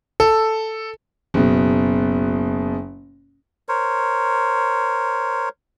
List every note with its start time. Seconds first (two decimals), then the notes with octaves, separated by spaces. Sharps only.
0.20 A4
1.34 F#1 B2
3.69 A#4 C5 C#5